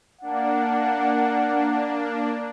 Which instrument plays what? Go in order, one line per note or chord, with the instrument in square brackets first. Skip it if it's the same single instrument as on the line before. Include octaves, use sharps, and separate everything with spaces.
[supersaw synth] A#3 D4 [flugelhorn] F#5